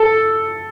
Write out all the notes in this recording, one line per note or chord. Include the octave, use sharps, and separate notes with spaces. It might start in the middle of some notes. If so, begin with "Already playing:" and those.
Already playing: A4